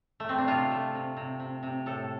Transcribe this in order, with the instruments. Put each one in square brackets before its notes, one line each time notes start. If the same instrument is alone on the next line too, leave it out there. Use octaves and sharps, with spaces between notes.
[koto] A3
C4
D4
C3 F4
A3
C3
C3
C3
C3
A2 A4